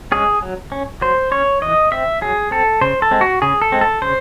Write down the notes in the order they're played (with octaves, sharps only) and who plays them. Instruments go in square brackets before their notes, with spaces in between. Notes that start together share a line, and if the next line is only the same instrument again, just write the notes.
[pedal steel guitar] G#3 C#4 G#4
F#3
C#4
F#3 C5
C#4 C#5
E3 D#5
C4 E5
F#3 G#4
C4 A4
C#3 C5
A4
G#3 C4
F#4
C#3 G#4
A4
G#3 C4
A4
C#3 C5